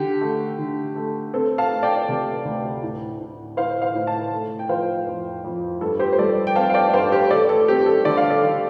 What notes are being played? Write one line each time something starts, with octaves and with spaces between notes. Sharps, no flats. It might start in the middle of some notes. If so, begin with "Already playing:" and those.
Already playing: D3 G4
A3
D3
A3
C4 A4
F5 A5
A3
D5 G5
C3
D2
A2
A2
A2 C5 F5
C5 F5
A2
F5 A5
A3
G5
F3 C5 F5
F2
F2
G2 A4
G4 C5
C5
G3 A4 D5
G5
C4 F5 A5
F5
D5 G5
G2 C5 F5
G4 C5
A3 A4 D5
A4
C4 G4
A4
D3 D5
F5
A4 D5
D3